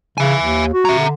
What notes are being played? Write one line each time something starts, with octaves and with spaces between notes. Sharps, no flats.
C#3 E5 G#5
D#2
F#4
E5 A#5
D3